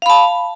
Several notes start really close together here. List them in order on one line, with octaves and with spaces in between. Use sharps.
F5 B5 A5